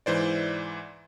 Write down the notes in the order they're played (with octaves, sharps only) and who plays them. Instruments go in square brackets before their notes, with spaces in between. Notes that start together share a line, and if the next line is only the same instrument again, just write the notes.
[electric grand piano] G#2 E3 C5 D5